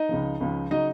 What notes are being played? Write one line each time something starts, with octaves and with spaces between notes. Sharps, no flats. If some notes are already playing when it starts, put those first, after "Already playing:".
Already playing: D#4 D#5
C#2 C#3 F3
C#2 C#3 F3
C#3 F#3 D#4 D#5